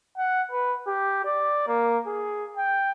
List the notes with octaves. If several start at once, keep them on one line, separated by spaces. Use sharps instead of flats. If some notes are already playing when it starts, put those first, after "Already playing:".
F#5
B4
G4
D5
A#3
G#4
G5